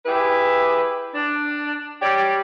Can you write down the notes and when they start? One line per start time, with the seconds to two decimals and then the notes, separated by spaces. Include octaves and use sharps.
0.06 E4 G4 G#4 B4
1.15 D4
2.01 G3 G4 C#5 D5